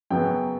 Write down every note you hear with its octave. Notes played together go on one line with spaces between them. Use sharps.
F#2 C#3 F#3 B3 G5